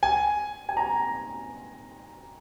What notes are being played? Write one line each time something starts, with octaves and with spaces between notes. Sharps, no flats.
G#5
G#5
A#5